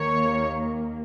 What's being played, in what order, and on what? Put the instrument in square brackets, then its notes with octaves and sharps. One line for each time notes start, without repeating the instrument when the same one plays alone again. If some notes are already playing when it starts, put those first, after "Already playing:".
Already playing: [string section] D#2 D#3 A#3 C#5